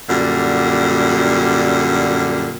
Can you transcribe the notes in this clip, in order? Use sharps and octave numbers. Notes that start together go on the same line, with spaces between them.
F#2 A#2 D3 G3